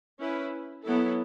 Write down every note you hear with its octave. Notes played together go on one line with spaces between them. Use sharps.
C#4 E4 B4
F#3 B3 E4 A4